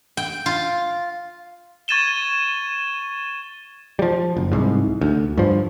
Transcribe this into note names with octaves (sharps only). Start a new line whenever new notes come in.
G5
F4
C#6 G#6 A6 D#7 E7 G7
F3 G3
F#1
C2 G#2
D2
G2 F3